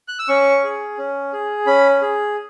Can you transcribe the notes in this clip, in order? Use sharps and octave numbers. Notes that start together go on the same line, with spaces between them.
F#6
E6
C#4 C#6
G#4
C#4
G#4
C#4 B5
G#4